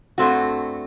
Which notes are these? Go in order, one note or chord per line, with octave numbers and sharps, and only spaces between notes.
G2 E3 A3 C4 F#4